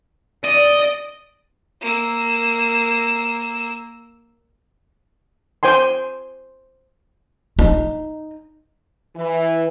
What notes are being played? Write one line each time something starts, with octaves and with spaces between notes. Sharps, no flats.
D5 D#5
A#3 E6
C5 G5 G#5 C6
D#4
E3